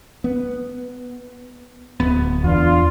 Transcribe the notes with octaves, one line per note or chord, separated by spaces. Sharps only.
B3
D1 B3
E2 D4 F4